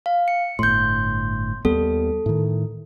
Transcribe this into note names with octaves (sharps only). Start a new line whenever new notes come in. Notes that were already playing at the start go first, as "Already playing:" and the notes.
F5
C#7
G1 A2 C6 G6
D#2 G3 B3 A4
A2 D#3